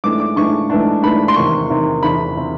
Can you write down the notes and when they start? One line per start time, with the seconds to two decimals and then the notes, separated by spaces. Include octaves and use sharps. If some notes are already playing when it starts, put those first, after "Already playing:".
0.04 G#2 E3 A3 D4 D6
0.20 D6
0.36 G#2 E3 A3 D4 C#6
0.70 G#2 E3 A3 D4
1.03 G#2 E3 A3 D4 B5
1.28 C6
1.36 E2 C3 D#3 C#6
1.70 E2 C3 D#3
2.03 E2 C3 D#3 B5
2.37 C3 D#3